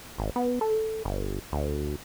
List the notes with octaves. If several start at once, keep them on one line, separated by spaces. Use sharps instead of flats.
G#1
B3
A4
G1
D2